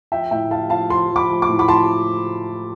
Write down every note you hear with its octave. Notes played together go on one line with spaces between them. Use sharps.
F3 E5 G5
A2 E5 G5
F3 F5 A5
F3 F5 A5
F3 A5 C6
F3
B5 D6
F3
D6
A2
B5 D6
F3 A5 C6